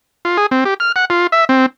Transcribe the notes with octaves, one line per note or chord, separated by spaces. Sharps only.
F4
G#4
C4
G4
F6
F#5
F4
E5
C4